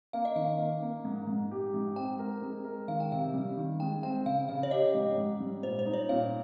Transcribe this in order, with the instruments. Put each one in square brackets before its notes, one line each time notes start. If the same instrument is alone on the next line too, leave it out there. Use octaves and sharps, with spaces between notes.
[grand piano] A#3 [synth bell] F5
[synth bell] D#5
[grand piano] D#3 [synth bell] F5
[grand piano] A#3
A#3
G#2
G#2
G4
G#2
[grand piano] C4 [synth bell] G5
[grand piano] A#4
G#3
A#4
[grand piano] D#3 [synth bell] F5
[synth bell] G5
[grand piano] C3 [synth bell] F5
[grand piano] G3
D#3
[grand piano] G#3 [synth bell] G5
[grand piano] C4 [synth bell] G5
[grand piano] C#3 [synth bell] F5
[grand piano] C#3 [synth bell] F5
[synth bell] C#5
[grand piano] G4 [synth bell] D#5
[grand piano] G#2
G#2
G3
[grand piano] A#2 [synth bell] C5
[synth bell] C5
[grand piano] D#4
[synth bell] C#5
[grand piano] A#2 [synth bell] F5